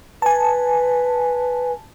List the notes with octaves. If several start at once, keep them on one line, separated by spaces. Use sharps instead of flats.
B4 G#5 A5